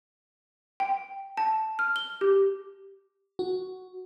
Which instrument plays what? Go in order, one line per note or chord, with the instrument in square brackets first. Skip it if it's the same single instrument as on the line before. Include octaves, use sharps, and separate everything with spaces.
[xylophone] G5
A5
F6
G7
G4
[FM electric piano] F#4